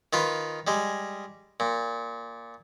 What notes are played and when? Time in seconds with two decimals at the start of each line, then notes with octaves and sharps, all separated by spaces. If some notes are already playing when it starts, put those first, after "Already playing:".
0.13 D#3 F4 B4
0.67 G3 G#3
1.60 A#2